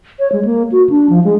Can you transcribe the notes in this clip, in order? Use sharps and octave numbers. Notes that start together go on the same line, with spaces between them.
C#5
G#3
A#3
F#4
D4
F3
G#3